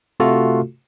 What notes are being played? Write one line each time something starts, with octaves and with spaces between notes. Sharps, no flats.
C3 A3 F4 F#4 A4